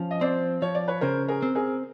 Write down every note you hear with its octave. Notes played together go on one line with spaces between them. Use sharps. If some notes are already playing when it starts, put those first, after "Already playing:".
Already playing: F3 C#4
D#5
C4 C5 D5
F3 C#5
D5
B4 C#5
C#3 A#4 C5
G#4 A#4
C4
G#4 A#4